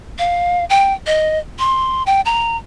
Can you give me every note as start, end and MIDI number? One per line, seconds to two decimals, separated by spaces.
0.19 0.65 77
0.70 0.93 79
1.07 1.38 75
1.59 2.03 84
2.06 2.21 79
2.25 2.57 82